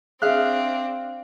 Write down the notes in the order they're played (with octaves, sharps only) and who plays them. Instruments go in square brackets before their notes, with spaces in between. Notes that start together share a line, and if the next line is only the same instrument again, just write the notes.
[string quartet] C4 D4 [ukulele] G#4 E5 [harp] F5 F#6